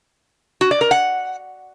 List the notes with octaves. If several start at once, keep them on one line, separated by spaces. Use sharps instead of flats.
F#4
D5
A#4
F#5